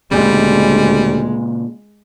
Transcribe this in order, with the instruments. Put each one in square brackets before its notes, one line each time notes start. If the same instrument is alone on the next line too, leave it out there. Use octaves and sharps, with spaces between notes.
[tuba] D2 [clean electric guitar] A#2 C#3 [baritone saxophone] G3 [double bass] G#3